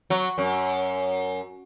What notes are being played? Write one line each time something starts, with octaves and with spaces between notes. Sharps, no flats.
F#3
F#2